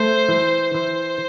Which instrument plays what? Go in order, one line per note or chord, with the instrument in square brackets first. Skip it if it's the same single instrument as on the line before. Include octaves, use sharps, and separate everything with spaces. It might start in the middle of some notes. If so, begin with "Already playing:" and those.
Already playing: [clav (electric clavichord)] A3 [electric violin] C5
[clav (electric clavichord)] E3
[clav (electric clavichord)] E3 [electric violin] C5